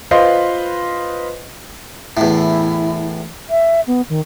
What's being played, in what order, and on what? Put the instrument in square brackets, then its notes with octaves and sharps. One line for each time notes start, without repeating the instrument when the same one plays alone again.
[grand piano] F4 B4 C5 D#5 F5 C6
[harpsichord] E2 A2 [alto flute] E4
[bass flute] E5
B3
D#3